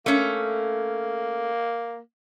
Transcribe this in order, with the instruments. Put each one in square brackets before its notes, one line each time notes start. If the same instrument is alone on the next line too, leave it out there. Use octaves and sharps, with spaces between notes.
[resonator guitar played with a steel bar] A3 C#4 [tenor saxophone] A#3